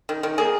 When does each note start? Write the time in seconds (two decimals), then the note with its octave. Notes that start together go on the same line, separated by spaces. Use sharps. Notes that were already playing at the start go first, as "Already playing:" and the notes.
0.09 D#3
0.23 D#3
0.38 A#3 G#4